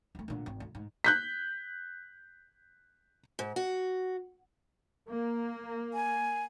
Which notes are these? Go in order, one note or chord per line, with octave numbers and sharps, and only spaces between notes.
D2 A3
A#2 D3
G#1 C4
D2
G#2
F#6 G6 B6
G#2
F#4
A#3
G#5